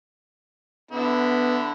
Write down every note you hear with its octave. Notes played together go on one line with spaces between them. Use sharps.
D3 B3 E4